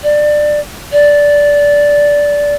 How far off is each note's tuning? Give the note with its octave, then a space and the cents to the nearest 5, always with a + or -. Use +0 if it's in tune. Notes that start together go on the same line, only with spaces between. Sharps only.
D5 +20
D5 -10